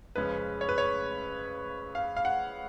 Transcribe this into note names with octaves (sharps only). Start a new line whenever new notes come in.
F2 C#3 G#3 C#4 B4
C#5
B4
C#5
F5
F5
F#5